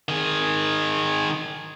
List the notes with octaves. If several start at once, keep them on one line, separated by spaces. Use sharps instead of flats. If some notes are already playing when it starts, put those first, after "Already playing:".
D#3 G#4